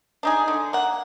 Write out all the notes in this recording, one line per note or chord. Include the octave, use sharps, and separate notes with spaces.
D4 D#4 G#4
D3
A#3 F#5